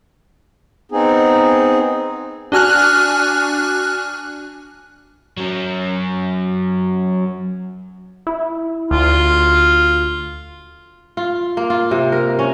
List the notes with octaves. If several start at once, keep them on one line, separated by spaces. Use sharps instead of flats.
B3 C4 D#4 G#4
D4 F#4 G#5 F6 F#6
F#3 C#4
E4
D2 F4
F4
A#3
F4
C3
A#4
C#4